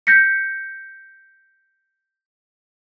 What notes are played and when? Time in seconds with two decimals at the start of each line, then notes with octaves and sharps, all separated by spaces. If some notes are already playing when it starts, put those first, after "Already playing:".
0.07 G6 A#6 B6 C#7